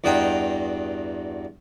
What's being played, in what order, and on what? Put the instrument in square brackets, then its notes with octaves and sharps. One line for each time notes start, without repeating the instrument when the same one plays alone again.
[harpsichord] E2 G2 F#4 D#5 G5 A#5